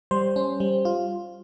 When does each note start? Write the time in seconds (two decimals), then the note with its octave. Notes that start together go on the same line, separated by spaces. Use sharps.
0.11 G3 C5
0.36 C#4
0.60 G3
0.85 F4